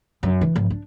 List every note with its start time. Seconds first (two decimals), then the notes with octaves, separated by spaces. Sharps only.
0.23 F#2
0.41 E3
0.56 G#1 F3
0.70 D4